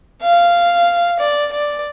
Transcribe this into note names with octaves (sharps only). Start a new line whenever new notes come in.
F5
D5
D5